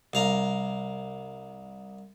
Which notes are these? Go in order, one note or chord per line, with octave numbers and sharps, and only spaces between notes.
C2 F5 A#5